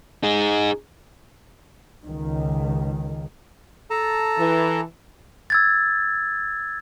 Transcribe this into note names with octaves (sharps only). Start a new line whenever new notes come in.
D#4 G#4
C#2 D#3
A4 A5 A#5
E3
E6 G#6 A6